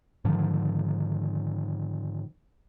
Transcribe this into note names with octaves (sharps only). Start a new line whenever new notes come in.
G#2 D3 D#3 F3